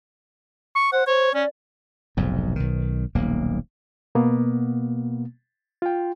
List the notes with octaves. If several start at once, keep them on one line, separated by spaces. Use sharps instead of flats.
C#6
C5 F#5
C5 C#5
C#4 D5
F1 B1 G#2
B1 D#3
D#1 B1 A#3
B2 A#3 B3
F4 G5